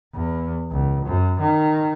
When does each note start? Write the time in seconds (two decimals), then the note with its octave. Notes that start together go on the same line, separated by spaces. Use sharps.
0.14 E2
0.71 C#2
1.06 F#2
1.40 D#3